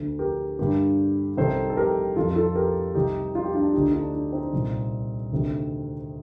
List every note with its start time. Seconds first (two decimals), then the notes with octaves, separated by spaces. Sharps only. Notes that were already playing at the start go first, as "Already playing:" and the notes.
Already playing: D2 D3
0.19 G4 A#4
0.59 G2 D3 G4 A#4
1.37 C2 C3 D#3 A4 C5
1.70 A4
1.77 G4 A#4
2.16 F2 D#3 F4 A4
2.35 F4 A4
2.55 G4 A#4
2.95 C2 C3 D#3 D#4 G4
3.35 F4
3.44 G4
3.54 D4 F4
3.74 D2 D3 D#4 G4
3.93 D4 F4
4.13 D4
4.33 C4 D#4
4.53 C2 A#2
5.32 D2 C3 D#3